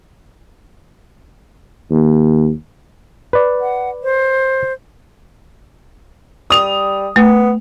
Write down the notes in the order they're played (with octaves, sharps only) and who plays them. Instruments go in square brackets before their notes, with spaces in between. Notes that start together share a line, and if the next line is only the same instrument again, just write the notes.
[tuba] D#2
[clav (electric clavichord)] B4 D5
[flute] F#5
C5
[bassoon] G3 [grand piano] D#6 F7
[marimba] A3 [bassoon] B3